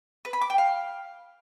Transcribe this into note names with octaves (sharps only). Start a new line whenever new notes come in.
B4
B5
D6
G5
F5